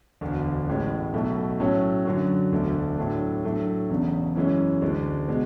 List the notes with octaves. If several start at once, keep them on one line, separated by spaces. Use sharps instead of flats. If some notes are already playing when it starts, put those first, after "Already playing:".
E1 D2 D3
A1 A2 G#3
B1 B2 A3
A2 F#3 A3 C#4
F#2 D3 F#3
E1 D2 D3 A3
A2 F#3 A3 D4
A2 F#3 A3 D4
E1 E2 C#3
F#2 E3 G#3 C#4
D2 D3 G#3
B2 G#3